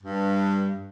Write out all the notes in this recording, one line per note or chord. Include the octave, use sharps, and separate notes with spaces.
G2